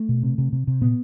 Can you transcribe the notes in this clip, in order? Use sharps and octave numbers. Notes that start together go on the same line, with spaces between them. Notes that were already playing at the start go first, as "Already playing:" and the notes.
Already playing: A3
B2
C3
C3
C3
C3
A#2 B3